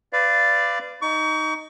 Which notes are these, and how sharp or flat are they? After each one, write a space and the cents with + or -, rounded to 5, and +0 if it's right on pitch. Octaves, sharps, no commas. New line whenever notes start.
B4 +25 D5 +0 F5 -20
D#4 +0 C#6 +35